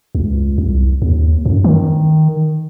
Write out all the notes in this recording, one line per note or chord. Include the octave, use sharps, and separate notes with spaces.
C#2
C2
D#2
F#2
D#3